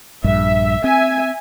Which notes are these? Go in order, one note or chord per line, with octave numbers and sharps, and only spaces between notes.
A#1 G2 E5
C4 E5 G#5